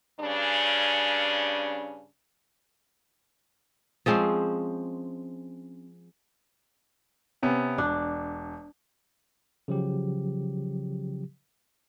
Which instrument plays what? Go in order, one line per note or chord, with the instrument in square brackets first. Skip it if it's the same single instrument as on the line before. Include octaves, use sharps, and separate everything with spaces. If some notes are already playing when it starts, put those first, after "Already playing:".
[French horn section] G2 C#3 C#4 D4
[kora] F3 G#3 C4 C#4
[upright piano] C3 B3 C#4
[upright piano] E1 [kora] D4
[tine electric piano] C#3 F3 F#3 G4